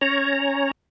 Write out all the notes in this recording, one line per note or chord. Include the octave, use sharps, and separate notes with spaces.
C#4 C#5 A#5